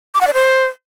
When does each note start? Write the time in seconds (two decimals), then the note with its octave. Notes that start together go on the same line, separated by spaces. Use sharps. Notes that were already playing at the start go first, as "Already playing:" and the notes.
0.14 D6
0.21 F#5
0.27 D5
0.34 C5